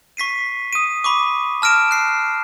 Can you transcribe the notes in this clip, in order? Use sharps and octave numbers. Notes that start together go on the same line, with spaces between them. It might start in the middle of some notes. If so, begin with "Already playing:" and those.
C#6 B6 C7 D#7
D#6 D#7
B5 C#6 D6
A5 F6 A#6 D7 E7
F#6 C7